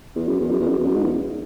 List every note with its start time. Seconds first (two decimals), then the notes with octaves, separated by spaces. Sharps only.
0.16 E2
0.28 F#2
0.40 E2
0.50 F#2
0.60 E2
0.68 F#2
0.77 E2
0.86 F#2
0.94 G#2
1.03 E2